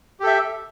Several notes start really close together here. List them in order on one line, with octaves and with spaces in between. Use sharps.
G4 A4 E5